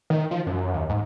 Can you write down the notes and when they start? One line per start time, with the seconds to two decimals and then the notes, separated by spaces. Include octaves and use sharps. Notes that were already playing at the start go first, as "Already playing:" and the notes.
0.10 D#3
0.31 F3
0.46 F#2
0.73 D#2
0.89 G#2